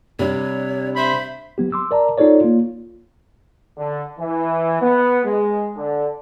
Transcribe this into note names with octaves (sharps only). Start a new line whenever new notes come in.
C3 G3 D4 C#5
C5 E5 B5
F#3 B3 G4
C6 D6 E6
A#4 D5 A5 A#5
D#4 F4 A4 C#5 D5
A#3 F4
D3
E3
B3
G#3
D3